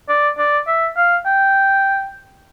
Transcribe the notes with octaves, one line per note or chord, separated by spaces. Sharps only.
D5
D5
E5
F5
G5